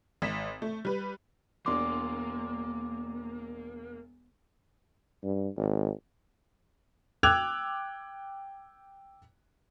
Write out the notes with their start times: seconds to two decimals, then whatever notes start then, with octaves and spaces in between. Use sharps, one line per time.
0.22 G#1 B6 E7
0.62 A3
0.85 G3 B4
1.66 E1 A#3 D4 C6 D6
5.24 G2
5.57 G#1
7.23 G5 D6 E6 F#6 G#6 F7